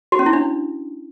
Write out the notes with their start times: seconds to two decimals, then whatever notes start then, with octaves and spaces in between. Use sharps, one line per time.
0.12 F#4
0.19 C#4
0.26 E4
0.33 D4